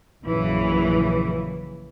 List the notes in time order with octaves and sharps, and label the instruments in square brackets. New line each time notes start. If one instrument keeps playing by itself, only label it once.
[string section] A#1 F#2 C#3 E3